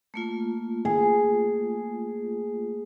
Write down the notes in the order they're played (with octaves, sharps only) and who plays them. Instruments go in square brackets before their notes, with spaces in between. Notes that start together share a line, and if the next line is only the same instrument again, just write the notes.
[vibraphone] A3 A#3 F4
[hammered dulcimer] G#4